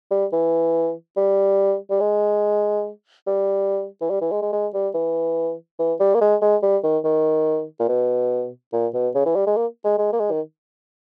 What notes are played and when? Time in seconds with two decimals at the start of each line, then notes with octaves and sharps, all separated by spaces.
0.11 G3
0.32 E3
1.16 G3
1.90 G3
2.00 G#3
3.27 G3
4.01 E3
4.10 G3
4.21 E3
4.31 G#3
4.42 G#3
4.52 G#3
4.74 G3
4.94 E3
5.79 E3
6.00 G3
6.14 A#3
6.21 G#3
6.42 G#3
6.62 G3
6.83 D#3
7.04 D#3
7.79 A#2
7.89 B2
8.73 A#2
8.94 B2
9.15 C#3
9.25 E3
9.35 G3
9.46 G#3
9.56 A#3
9.84 G#3
9.98 G#3
10.12 A#3
10.20 G#3
10.31 D#3